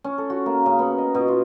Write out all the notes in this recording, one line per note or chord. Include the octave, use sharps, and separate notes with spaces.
C#4
A4
F#4
A#3
C#3
B3
D#5
B2
F4